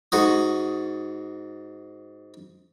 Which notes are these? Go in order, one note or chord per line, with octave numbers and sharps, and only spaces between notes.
G#2 F#4 D#6